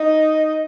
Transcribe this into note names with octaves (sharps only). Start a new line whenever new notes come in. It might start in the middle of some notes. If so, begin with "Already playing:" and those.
Already playing: D#4